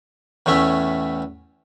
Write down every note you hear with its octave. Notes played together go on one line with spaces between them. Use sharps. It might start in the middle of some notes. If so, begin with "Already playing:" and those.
E2 A2 A3 C#4 E5